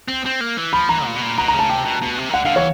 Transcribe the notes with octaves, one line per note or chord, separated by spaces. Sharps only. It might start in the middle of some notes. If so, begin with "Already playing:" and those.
C4
C4
A#3
E3
F3 B5
E3 A#5
A#2
B2
A#2
B2 A#5
A#5
C#3 A5
C3 G5
B2
B2
C3
D#3
D3 F#5
D3 F5
E3 C#5